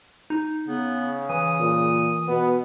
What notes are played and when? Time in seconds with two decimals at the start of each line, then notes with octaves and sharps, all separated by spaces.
0.30 D#4
0.68 C#3 B3
1.29 E3 D#6
1.60 A#2
2.28 B2 B3